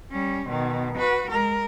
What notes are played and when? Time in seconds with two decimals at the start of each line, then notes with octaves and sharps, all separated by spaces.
0.11 G3 C#4
0.48 B2 D#3
0.98 F#4 B4
1.30 G#3 A#4